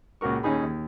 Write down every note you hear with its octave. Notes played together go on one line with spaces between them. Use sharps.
C#2 A#2 F#4 A#4 C#6
D#2 C#4 D#4 G#4 B5
D#2